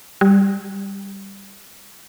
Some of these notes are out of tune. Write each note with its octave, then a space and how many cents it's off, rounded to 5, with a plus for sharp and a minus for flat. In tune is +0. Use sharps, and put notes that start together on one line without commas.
G3 +5